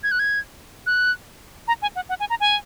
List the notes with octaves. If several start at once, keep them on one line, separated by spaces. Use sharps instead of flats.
G#6
F#6
G#6
F#6
A#5
G#5
F#5
F#5
G#5
A#5
G#5